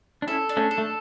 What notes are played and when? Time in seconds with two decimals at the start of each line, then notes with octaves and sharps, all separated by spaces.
0.22 D4
0.27 C#4 E4 A4
0.49 D4
0.57 A3 C#4
0.71 A4
0.78 A3